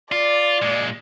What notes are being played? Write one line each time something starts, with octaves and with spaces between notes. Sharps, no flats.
F4 D5
A#2 G#3